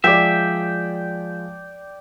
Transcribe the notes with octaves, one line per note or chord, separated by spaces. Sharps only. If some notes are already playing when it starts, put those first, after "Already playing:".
F3 G#3 D5 E5 G5